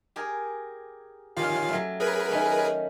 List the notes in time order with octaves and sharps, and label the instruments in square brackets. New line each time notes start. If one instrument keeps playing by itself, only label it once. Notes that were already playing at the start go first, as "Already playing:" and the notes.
[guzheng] G4 G#4 A#4
[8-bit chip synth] D#3 F4 F5 [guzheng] C#4 G4
[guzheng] F#3 A3
[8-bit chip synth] G#4 A#4 B4
[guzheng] D#3 A3 C#4